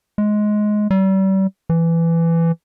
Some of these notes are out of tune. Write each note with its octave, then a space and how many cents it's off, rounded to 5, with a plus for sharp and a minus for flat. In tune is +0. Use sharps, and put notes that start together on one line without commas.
G#3 +15
G3 -35
E3 +15